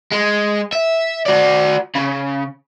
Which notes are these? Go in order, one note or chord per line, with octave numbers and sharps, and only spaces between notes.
G#3
E5
F#4 D5
C#3